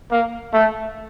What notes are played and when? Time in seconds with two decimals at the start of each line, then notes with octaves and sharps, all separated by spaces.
0.10 A#3
0.53 A3